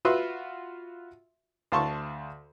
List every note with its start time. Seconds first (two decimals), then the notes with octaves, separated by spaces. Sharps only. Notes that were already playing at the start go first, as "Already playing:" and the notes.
0.05 F4 F#4 B4 E5 C6 E6
1.72 D2 F5 A5 C6 C#6